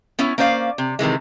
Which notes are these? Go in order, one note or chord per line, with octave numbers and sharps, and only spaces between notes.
B3 C#4 E4 C#5
A#3 C#4 C5 D5 F5
C3
C3 D#3 E3 G#3